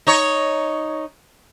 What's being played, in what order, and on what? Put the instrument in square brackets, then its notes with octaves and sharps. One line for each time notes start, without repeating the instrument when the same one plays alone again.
[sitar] D#4 C#5